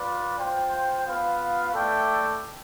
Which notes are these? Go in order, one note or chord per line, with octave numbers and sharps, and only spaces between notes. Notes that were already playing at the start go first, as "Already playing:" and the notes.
Already playing: F4 B4 D5
F4 C5 G5
B3 F4 B4 F5
A3 E4 A4 D5 G5